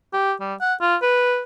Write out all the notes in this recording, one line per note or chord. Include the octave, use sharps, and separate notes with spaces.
G4
G3
F#5
F4
B4